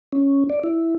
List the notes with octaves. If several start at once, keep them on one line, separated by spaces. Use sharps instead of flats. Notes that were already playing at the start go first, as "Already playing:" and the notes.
C#4
D5
E4